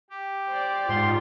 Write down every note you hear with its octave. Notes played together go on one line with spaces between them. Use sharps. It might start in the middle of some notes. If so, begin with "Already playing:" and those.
G4
C5 D5
G#2 F4 C6